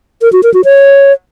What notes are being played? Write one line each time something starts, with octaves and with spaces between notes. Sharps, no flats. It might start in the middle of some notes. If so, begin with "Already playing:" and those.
A#4
F#4
A#4
F#4
C#5